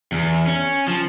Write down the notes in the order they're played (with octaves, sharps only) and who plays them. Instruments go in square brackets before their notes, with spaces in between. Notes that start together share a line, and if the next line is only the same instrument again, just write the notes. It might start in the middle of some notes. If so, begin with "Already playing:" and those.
[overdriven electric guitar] E2
C#4
F3